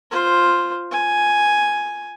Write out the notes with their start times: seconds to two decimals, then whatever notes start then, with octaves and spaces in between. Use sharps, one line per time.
0.11 F4 C5
0.92 G#5